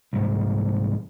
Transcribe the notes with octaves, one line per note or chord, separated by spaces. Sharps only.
C2 G#2